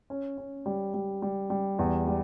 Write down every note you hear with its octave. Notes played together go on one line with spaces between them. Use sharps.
C#4
C#4
G3
G3
G3
G3
E2
G3